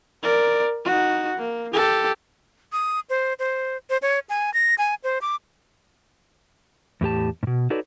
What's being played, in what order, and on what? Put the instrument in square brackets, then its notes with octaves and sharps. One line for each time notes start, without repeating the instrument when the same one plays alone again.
[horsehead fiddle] A#4 D5
D#4 F#4
A#3
G4 A4
[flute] D#6
C5
C5
C5
C#5
G#5
A#6
G#5
C5
D6
[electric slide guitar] E2 A2 G4 A5
G#2 B2
D#4 F#4 A4 B4 C#5 D5